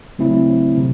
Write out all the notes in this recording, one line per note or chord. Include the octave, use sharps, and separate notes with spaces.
C#3 F#3 A3 C4 E4
C3